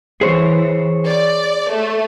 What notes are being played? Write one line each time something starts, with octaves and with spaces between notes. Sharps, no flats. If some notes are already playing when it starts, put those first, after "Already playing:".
E3 G#4 C5 C#5
D5
A3